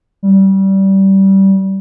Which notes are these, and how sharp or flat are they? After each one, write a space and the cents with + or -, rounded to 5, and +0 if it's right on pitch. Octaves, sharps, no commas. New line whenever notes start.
G3 -20